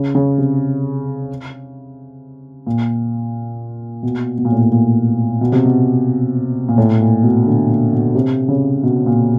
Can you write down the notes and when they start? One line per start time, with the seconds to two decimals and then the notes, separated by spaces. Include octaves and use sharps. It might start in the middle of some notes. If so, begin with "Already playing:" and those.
Already playing: C#3
0.15 C#3
0.38 C3
2.67 A#2
4.03 B2
4.38 B2
4.45 A#2
4.52 A2
4.60 A#2
4.72 A#2
5.41 B2
5.52 C3
5.65 B2
6.68 A#2
6.78 A2
7.01 A#2
7.23 B2
7.46 D3
7.69 A#2
7.92 B2
8.15 C3
8.48 C#3
8.83 B2
9.06 A#2